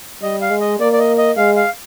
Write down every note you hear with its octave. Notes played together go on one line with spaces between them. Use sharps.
G3 D#5
F5
G#3
D#5
A#3 D5
D5
D#5
D#5
G#3 F5
F5